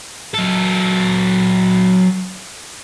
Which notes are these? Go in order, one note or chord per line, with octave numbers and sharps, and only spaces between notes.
F#3 A4